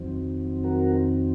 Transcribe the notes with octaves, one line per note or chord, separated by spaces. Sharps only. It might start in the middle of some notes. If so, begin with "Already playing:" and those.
Already playing: F2 D#3 F#3 C4
F#4 A#4